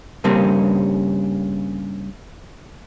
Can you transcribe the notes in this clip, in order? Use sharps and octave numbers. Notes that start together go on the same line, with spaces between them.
G2 C#3 G3 A#3 C4 C#4